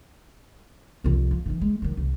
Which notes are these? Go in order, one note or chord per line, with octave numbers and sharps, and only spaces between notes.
C2 F2
F3
D#3 E3
G#3
D#3 F#3
C2